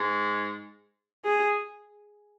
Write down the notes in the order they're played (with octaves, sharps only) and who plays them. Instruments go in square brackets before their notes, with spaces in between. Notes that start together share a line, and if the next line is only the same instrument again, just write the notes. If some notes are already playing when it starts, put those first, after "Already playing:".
Already playing: [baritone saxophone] G#2
[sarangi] G#4